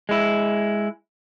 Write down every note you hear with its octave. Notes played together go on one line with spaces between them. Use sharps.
G#3 E4